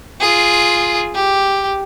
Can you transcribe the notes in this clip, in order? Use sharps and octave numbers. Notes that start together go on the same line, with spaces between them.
F4 G#4
G4